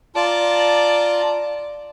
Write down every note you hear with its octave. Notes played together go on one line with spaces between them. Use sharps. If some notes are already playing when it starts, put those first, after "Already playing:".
F4 D5 A5 A#5